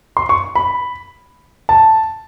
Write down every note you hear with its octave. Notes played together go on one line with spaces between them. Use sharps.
C6
C#6
B5
A5